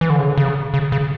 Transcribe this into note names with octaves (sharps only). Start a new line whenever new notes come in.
E3
D3
C#3
D3
C#3
C#3
C#3